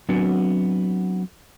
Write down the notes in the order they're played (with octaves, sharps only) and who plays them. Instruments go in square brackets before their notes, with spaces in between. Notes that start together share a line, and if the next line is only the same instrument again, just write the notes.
[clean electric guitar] F#3 B3 C4 D4 F#4